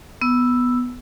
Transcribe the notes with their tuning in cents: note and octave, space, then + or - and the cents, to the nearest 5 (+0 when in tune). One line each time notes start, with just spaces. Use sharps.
B3 +0 E6 +0